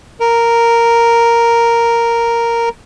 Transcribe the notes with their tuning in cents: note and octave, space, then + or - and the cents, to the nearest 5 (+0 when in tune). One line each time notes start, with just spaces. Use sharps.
A#4 -5